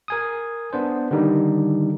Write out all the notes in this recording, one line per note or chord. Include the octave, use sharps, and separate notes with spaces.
A#4 G#5 D#6
B3 D4 C5
D3 D#3 G3 D#4